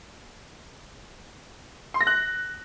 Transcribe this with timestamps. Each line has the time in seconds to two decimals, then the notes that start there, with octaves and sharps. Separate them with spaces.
1.94 C6
2.01 A#6
2.07 F#6